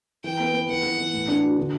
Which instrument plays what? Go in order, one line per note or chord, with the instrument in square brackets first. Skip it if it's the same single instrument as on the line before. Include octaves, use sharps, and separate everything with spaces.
[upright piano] E3 [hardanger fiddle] G5
[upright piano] B3
B3
[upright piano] E3 [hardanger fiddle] F#5
[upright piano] E3
E3
A2
D4
F#4
D3